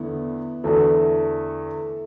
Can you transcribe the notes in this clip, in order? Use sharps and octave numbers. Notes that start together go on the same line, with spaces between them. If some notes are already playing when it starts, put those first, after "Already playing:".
Already playing: E2 D3 A3 B3 E4
E2 D3 A3 E4 F#4 A4